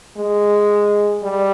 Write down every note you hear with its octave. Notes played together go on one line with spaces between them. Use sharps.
G#3
G3